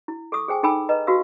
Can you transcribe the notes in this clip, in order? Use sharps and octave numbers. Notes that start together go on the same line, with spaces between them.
E4
A4 C#6 D#6
G#4 C5 G5 G#5
D#4 A4 G5 G#5 B5 E6
B4 D#5 A#5
F#4 G4 B4 F5 E6